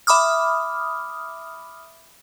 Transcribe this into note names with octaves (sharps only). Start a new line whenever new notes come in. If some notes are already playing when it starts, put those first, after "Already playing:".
E5 B5 D6 D#6 F6